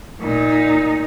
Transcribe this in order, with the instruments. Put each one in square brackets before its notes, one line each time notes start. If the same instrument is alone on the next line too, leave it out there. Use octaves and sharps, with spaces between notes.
[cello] A#2 D#4